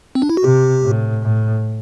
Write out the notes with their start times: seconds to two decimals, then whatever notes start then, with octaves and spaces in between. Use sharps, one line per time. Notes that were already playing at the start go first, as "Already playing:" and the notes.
0.15 C4
0.22 D4
0.29 E4
0.37 F#4
0.44 C3 G4
0.83 A2
1.23 A2